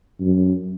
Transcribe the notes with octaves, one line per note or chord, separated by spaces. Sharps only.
F#2